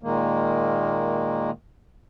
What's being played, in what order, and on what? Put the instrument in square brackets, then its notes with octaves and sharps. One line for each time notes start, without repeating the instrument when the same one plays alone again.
[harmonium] A#2 D#3 G#3 A#3